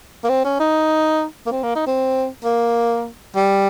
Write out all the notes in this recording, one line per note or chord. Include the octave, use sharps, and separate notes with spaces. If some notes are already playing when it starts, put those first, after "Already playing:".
A#3
C4
C#4
D#4
A#3
C4
A#3
D#4
C4
A#3
G3